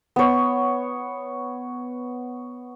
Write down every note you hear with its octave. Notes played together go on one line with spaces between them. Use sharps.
B3 C#5